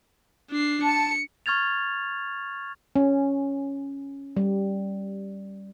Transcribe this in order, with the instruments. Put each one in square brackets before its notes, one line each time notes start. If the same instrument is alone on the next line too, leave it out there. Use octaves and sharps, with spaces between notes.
[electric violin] D4 C7
[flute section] A5 [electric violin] C#7
[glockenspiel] C#6 F6 G#6 A6 F7
[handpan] C#4
G3